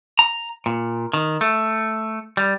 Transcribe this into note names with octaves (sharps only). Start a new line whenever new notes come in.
A#5
A#2
D#3
A3
G3